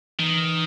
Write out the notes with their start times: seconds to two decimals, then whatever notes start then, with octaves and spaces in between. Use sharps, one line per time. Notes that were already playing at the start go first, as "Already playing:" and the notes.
0.19 D#3 E3